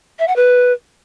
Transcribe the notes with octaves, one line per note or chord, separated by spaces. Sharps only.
E5
F#5
B4